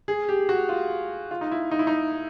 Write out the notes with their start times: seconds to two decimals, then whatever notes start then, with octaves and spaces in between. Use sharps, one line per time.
0.08 G#4
0.29 G4
0.49 F#4
0.69 F4
1.31 F4
1.41 D#4
1.51 E4
1.71 D#4
1.79 E4
1.87 D#4